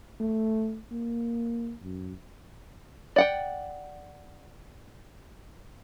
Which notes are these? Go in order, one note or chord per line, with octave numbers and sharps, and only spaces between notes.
A3
A#3
F#2
D5 F#5 G5